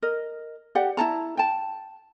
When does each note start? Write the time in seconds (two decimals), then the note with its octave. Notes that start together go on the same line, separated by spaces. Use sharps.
0.02 A#4 D#5
0.75 G4 D5 F#5
0.97 E4 F#5 A5 A#5
1.37 G5 A5